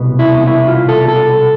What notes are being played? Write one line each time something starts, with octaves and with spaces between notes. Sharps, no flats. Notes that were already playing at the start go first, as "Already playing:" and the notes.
Already playing: C2 B2 B3
E4
E4
F4
A4
A4